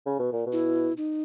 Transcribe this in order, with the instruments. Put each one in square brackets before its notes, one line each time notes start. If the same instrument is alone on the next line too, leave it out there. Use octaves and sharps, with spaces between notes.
[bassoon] C#3
B2
A#2
B2
[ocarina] E4
D#4